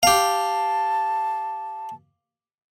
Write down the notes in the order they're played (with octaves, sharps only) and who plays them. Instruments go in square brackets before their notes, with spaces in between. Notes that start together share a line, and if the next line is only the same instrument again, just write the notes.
[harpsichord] G4 F5 [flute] A5